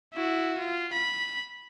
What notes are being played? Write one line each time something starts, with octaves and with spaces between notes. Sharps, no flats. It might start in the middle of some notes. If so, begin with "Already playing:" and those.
E4 F#4
F4
B5